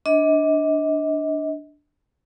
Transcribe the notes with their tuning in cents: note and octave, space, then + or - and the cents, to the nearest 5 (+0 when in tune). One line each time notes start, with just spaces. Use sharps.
D4 +0 D#5 +35